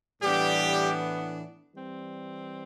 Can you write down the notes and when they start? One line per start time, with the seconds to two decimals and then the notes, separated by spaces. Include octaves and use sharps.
0.22 A2 E3 G3 B3 D4 G4
1.74 E3 G3 C4